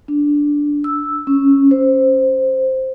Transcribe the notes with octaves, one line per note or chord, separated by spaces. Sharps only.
D4
E6
C#4
C5